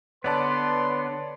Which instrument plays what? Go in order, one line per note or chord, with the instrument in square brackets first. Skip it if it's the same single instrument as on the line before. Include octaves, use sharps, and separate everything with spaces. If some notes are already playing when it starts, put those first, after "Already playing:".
[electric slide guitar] D3 B3 [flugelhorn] B4 [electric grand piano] C#5 D5 A5 [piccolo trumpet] C6